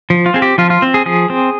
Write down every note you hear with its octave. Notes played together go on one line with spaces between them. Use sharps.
F3
F4
C4 G#4
G4
F3 F4
F4
C4
G#4
F3 G#4
C4